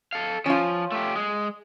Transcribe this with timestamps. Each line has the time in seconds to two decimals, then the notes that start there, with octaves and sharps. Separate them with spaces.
0.13 A4 F5
0.46 F3 C#4 F4
0.92 A3 G4
1.16 G#3